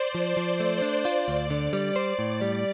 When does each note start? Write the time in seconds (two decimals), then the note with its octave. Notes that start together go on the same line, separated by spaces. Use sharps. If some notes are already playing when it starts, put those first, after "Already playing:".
Already playing: C5 D5
0.15 F3
0.37 F3
0.60 A3
0.82 D4
1.05 F4
1.28 D2
1.50 D3
1.73 G3
1.96 C5 D5
2.19 A2
2.41 G3